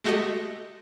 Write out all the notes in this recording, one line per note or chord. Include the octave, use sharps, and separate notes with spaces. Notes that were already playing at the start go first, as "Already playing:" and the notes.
G#3 A3 F#4 G4 A4 D#5